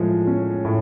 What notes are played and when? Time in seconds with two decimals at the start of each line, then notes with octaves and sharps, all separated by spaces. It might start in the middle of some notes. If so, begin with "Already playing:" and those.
Already playing: A2 F3 G#3
0.27 C#4
0.65 A2